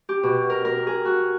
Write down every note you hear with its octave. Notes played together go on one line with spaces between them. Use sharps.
G4
B2
A#4
A#4
G#4
F#4